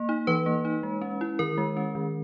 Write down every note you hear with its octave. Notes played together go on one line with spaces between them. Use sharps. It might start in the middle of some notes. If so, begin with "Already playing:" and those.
Already playing: A#3
D#4
E3 B4
A#3
D#4
G#3
C#4
E4
D#3 A#4
G#3
C#4
D#3